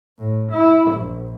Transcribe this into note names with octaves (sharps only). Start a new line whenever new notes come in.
A2
E4
A#1